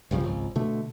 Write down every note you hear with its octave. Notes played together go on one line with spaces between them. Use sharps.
B1 G2 C#3 F3
G#1 C#2
B2 D3 A3